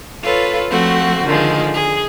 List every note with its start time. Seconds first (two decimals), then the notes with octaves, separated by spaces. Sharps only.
0.23 F4 A4 B4 C#5
0.70 F3 A3 C4 F#4
1.24 D3 D#3 F3 G#3
1.74 G#4